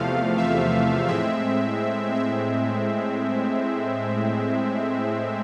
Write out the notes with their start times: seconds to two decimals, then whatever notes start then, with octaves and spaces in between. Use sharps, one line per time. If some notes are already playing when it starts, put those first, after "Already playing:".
Already playing: E2 C3 F3 A3 F5
0.38 E5
1.08 A2 G#3 C4 E5
2.14 E5